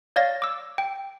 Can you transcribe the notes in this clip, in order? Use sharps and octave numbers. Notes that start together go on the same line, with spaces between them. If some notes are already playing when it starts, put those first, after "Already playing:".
C#5 D5 F5 A6 A#6
D6 E6
G5